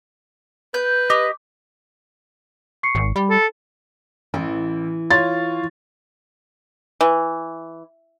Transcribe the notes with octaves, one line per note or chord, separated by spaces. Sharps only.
B4 G6
G4 D#5
C#6 C7 C#7
G#1
G3 B5
A4
A1 E3
F4 C#5 C6 A6
E3